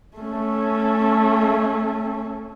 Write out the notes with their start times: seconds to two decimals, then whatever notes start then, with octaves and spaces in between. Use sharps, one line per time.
0.17 A3 C#4